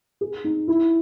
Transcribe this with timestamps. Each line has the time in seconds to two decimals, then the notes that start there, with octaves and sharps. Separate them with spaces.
0.21 G#4
0.44 D#4
0.68 E4